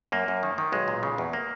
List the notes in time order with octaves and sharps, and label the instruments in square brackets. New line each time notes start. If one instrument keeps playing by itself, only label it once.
[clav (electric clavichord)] F#2 A#3
F#2
D#3
D#3
B1 G#3
A#2
C#3
E2
A#3